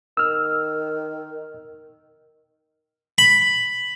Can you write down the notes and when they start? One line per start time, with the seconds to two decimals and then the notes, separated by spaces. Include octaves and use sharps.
0.17 D#3 E6 F6
3.18 B5